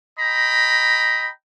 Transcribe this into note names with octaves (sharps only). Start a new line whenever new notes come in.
D#5 G5 A#5 B5